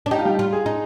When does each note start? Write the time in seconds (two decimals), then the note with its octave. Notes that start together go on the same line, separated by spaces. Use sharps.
0.06 D4
0.11 D#4 G4
0.18 F4
0.25 G3 G4
0.39 F4
0.52 G#3 G#4
0.66 D#4